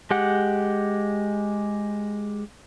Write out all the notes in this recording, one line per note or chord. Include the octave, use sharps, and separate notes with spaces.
G#3 G4 F#5